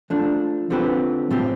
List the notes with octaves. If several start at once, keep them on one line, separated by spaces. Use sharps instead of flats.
F3 A3 D4
D3 F3 C4 G4 B4
A2 F3 C4 G4